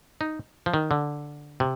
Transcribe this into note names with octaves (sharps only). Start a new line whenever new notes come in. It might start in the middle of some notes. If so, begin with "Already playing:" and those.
D#4
F3
D#3
D3
C3